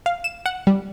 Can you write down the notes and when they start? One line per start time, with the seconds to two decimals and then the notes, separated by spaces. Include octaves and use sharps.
0.06 F5
0.24 E7
0.46 F#5
0.67 G3